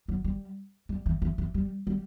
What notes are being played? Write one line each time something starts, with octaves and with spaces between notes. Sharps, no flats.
F#3
G3
G3
E3
E3
E3
G3
G3